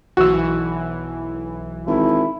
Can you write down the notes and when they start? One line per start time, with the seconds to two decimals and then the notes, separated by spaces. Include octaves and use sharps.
0.17 B1 E3 F#4 E6
1.87 G#1 E4